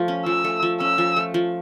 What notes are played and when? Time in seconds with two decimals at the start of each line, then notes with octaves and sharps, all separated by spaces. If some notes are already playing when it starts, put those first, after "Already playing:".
Already playing: F3 A3
0.08 C#4
0.26 F3 E6
0.44 A3
0.63 F3
0.80 C#4 E6
0.98 F3
1.16 A3
1.34 F3